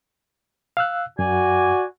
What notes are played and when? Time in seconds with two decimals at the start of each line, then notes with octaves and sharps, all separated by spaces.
0.77 F5 E6 F#6
1.19 F#2 F#4 D5 G#5